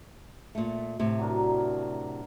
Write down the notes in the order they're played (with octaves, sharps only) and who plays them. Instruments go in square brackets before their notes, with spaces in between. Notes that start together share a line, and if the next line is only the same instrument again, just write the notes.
[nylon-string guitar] A#2 A3
A2 C3
[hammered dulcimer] F#3 D4 A#4